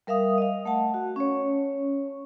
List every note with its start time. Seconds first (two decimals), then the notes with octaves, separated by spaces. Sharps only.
0.07 G3 A#4 E5 F5 D#6
0.38 D#5 F5
0.65 A3 F#5 A5
0.94 F#4
1.16 C#4 C#5